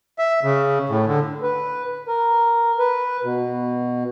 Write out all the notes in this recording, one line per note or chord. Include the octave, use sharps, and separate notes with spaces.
E5
C#3
A2
D3
B4
A#4
B4
B2